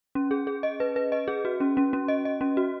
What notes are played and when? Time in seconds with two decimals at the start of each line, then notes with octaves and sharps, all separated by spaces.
0.15 C#4
0.31 G#4
0.47 G#4
0.63 D#5
0.80 B4
0.96 B4
1.12 D#5
1.28 G#4
1.45 F#4
1.60 C#4
1.77 C#4
1.93 C#4
2.08 D#5
2.25 D#5
2.41 C#4
2.57 F#4